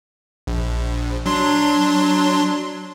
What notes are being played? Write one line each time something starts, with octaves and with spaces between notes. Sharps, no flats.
A#1
F#3 D4 C6